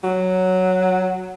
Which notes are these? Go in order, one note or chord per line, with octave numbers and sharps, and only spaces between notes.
F#3